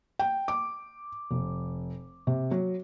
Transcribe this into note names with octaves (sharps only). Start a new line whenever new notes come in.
G5
D6
F1
C3
F#3